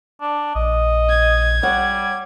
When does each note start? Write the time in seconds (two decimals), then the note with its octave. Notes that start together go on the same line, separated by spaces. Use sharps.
0.21 D4
0.55 A#1 D#5
1.09 G#6
1.63 G3 C#5 F#5